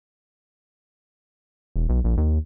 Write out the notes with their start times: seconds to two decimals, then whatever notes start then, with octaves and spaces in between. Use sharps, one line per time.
1.76 E1
1.89 B1
2.04 A#1
2.17 D#2